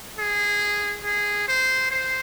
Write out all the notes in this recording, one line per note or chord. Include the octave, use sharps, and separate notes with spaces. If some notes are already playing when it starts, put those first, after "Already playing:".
G#4
G#4
C5
C5